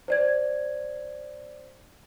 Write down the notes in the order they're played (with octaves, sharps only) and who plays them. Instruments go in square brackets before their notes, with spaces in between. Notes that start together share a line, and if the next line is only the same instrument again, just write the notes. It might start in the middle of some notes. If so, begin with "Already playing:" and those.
[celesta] C5 D5 G#6